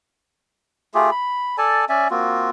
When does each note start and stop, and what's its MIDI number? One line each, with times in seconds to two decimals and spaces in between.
0.94 1.10 57
0.94 1.10 65
0.94 1.10 67
0.94 1.10 68
1.11 1.56 83
1.58 1.85 69
1.58 1.85 74
1.58 1.85 80
1.58 1.85 81
1.89 2.08 61
1.89 2.08 74
1.89 2.08 76
1.89 2.08 80
2.10 2.50 58
2.10 2.50 60
2.10 2.50 65
2.10 2.50 66